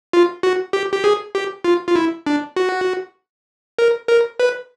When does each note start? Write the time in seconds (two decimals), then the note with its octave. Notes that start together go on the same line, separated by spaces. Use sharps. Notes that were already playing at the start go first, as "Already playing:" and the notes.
0.13 F4
0.43 F#4
0.73 G4
0.93 G4
1.04 G#4
1.35 G4
1.64 F4
1.87 F4
1.96 E4
2.26 D4
2.56 F#4
3.78 A#4
4.08 A#4
4.40 B4